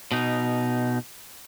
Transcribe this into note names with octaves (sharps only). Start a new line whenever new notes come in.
B2 D#4